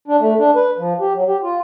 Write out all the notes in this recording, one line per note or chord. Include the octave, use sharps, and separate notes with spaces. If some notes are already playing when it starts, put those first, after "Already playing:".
D4
A3
D4
B4
F3
G4
F#3
G4
F4